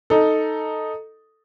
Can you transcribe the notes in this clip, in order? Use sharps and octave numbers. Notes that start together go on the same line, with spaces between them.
D#4 A4